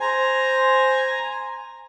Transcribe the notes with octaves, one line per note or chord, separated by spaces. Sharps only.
C5 G#5 A#5